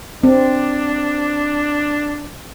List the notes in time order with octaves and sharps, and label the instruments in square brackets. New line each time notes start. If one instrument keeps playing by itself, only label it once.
[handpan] C4 [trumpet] D4